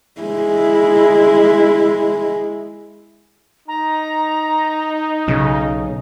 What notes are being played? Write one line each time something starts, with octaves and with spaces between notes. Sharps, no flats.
G#3 E4
D#4 A#5
B1 C#3